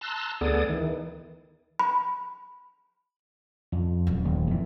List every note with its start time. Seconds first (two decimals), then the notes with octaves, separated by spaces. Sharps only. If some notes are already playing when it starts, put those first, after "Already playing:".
0.01 A5 A#5 C6 E6 F#6
0.41 D2 B3 G#4 A4 D5 D#6
0.69 D#3 E3
1.79 B5
3.72 F2
4.07 D#1 F#3
4.25 D#2
4.47 F2 E3